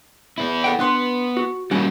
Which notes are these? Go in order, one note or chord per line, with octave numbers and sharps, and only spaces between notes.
B3 E4
A4 F#5 G5
B3 D4 B4 C6
F#4
G3 A#3 C#4 F#4